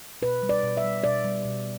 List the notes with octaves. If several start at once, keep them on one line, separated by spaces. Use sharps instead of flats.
B2 B4
G3
D5
B2
E5
G3
B2 D5
G3
B2